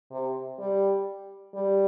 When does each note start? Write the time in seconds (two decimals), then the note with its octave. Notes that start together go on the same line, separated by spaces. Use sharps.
0.11 C3
0.59 G3
1.55 G3